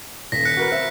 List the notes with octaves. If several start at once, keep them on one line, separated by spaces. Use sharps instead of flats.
D#1 A#6 B6
F#6 C#7
F#4 A#4 B4
C4 E5